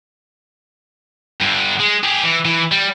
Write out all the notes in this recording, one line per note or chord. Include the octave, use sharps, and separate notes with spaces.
G2 D3
G#3
G4 G#4
E3
E3
G3